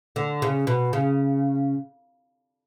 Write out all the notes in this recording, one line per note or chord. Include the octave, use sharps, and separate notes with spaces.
D3
C#3
B2
C#3